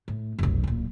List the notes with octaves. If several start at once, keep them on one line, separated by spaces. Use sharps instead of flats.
A2
F1 B1
D1 A#2